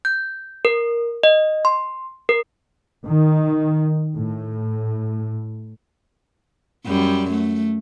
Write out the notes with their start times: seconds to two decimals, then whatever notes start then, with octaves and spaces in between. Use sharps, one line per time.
0.05 G6
0.65 A#4
1.23 D#5
1.65 C6
2.29 A#4
3.07 D#3
4.14 A2
6.86 F#2 G3
7.30 A3